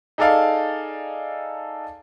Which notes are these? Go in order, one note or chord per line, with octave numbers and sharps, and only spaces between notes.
D#4 G#4 A4 D5 F5